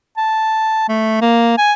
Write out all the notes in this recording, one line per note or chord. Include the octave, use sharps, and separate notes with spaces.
A5
A3
A#3
G#5